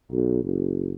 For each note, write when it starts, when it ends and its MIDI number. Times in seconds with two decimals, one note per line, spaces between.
0.12 0.43 35
0.44 0.95 30